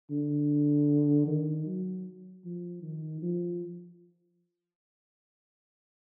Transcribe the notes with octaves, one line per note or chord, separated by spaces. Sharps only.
D3
D#3
F#3
F3
D#3
F3